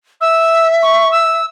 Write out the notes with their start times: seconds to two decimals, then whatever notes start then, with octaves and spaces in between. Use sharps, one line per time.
0.21 E5 E6
0.83 C#6
1.12 E6